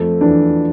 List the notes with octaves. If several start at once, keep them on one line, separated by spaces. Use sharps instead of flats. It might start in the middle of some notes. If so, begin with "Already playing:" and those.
Already playing: F2 F3 A3
E2 E3 D4